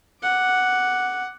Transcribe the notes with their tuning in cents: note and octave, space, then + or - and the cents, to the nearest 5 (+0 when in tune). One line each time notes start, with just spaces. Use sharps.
F#5 +0 D6 +0